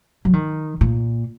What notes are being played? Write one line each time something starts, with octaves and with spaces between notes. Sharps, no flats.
F#3
D#3
A#2